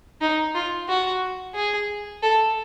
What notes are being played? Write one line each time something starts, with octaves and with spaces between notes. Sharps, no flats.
D#4
F4
F#4
G#4
A4